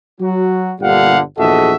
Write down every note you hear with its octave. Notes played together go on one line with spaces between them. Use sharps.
F#3 F#4
G1 A#2 D3 G3 F5 F#5
A#1 E2 F#4 A4 D#5 E5